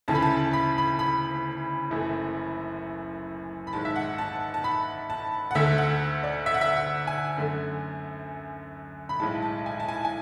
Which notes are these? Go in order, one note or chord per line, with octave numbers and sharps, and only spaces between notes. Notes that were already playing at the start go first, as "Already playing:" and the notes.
D2 C#3 E3 A3 A5
B5
A5
B5
B5
B5
F#1 F#2 E3 A3
B5
G#1 G#2 G#3 A5
E5
F#5
A5
A5
B5
A5
F#5
D2 D3 A3 E5
F#5
D5
E5
F#5
E5
F#5
G#5
F#2 D3 A3
B5
B1 A2 G#3 A5
A5
G#5
A5
G#5
G#5